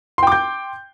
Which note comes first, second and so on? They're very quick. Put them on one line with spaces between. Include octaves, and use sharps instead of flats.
C6 G5 D6 G6